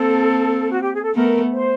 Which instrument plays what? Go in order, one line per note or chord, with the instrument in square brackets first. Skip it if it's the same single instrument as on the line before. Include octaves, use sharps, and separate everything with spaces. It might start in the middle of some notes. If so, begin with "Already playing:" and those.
Already playing: [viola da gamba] A#3 C4 [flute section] A4
[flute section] F#4
G4
G#4
A4
[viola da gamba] A3 B3 [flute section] A#4
[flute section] C5